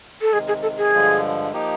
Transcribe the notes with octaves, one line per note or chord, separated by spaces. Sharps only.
A4
C3 D#3 G#3 G#4
G#4
A4
G#4
G2 D3 F3 G#3
F3 A#3 D#4 G4